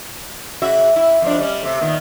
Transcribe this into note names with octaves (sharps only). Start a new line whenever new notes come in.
C#3 F#4 E5
E4
F2 F3 D4
G3 C#4
C3 A3
A#2 D#3 B3